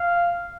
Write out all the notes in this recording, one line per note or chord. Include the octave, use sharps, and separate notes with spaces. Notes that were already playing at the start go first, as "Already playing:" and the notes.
Already playing: F5